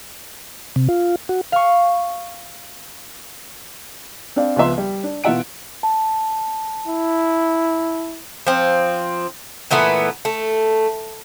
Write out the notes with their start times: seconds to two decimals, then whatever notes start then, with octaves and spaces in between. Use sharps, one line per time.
0.76 C3
0.89 F4
1.29 F#4
1.52 F5 C#6
4.36 C4 D4 D5 F5
4.56 C#2 F3 B3 E5 C6
4.78 G3
5.04 D4
5.24 B2 E3 F4 E5 F#5 D7
5.83 A5
6.87 E4
8.47 F3 C4
9.71 A#2 E3 A3 B3
10.25 A3